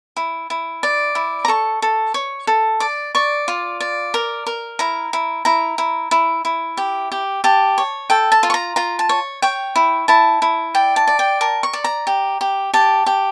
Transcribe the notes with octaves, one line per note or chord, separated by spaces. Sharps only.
E4
E4
D5
E4
A#5
A4 C#6
A4
C#5
A4
D5 D6
D5 C#6
F4
D5
A#4
A#4
E4 A#5
E4
E4 A#5
E4
E4
E4
G4
G4
G4 A5
C#5
A4 G5
A5
F4
C#6
A#5
F4 A#5
A5
C#5
C#5 G5
E4
E4 A5
E4
D5 G5
A5
D5
G5
A#4 A5
C#6
D5
A#5
G4
G4
G4 A5
G4